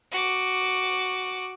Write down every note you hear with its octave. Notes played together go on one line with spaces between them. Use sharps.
F#4 D6